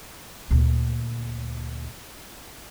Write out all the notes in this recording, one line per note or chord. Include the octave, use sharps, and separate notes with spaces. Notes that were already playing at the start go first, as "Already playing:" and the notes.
D2 A#2